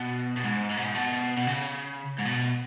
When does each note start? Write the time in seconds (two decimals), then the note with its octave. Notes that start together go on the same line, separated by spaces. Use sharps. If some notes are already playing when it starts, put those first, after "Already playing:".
Already playing: B2
0.37 B2
0.44 G#2
0.70 G#2
0.77 B2
0.85 G#2
0.95 B2
1.37 B2
1.47 C#3
2.19 G#2
2.25 B2